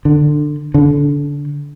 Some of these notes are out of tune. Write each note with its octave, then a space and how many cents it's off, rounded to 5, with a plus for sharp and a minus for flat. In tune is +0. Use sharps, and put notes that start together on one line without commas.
D3 +20
D3 -25